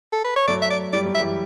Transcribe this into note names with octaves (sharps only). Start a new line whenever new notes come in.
A4
B4
C#5
F#3 A3 D5
E5
D5
G3 D5
F#3
E5
E3 G3